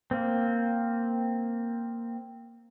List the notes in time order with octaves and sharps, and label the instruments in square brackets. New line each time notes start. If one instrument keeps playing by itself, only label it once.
[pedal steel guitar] A#3 C4